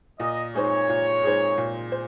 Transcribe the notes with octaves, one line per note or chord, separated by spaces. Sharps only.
A#2 D#5
G#3 D#4 G#4 C5 C#5
A#2
G#3 D#4 G#4 C5
A#2
C5